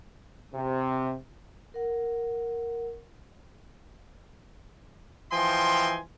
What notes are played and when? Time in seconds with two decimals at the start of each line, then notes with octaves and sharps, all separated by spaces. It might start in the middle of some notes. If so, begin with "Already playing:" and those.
0.54 C3
1.74 A#4 F#5
5.32 E3 F3 D#5 G5 G#5 C6